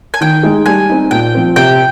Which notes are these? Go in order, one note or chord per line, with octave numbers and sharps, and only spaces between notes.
G#5
D#3 G5
G#3 D#4 G#4
G3 G#5
C4 D#4
A#2 G5
F3 C4
C3 G5